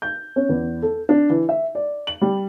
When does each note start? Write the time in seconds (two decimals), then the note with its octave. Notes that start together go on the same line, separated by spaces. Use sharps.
0.02 G6
0.36 C#4
0.49 E2
0.82 A4
1.09 D4
1.30 E3
1.49 E5
1.75 D5
2.07 F#7
2.22 G3